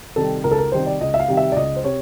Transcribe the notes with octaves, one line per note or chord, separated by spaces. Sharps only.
C3 D#3 G3 A4
C#2 A#4
A4
A#4
C3 D#3 G3 C5
D5
C#2 D#5
E5
F5
C3 D#3 G3
E5
D5
C#2 D#5
C5
C3 C#5